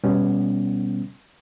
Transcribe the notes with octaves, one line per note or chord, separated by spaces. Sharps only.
B2 G3 B3 C#4